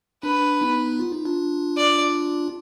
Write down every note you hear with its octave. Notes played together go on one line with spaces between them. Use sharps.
D4 B4
B3 D#4
F4
D#4
D4 F4
D5